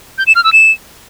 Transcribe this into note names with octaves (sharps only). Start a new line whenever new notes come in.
G6
E7
F6
E6
E7